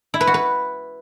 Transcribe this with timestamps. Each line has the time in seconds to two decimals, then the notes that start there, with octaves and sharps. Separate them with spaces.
0.14 E4
0.21 B4
0.27 F#4
0.34 B4